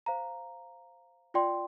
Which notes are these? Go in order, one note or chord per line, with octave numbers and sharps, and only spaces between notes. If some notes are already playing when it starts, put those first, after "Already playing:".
C5 F5 A#5
F4 D5 G5 C6